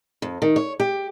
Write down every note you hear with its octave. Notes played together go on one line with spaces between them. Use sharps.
F2
D#3
C#5
G4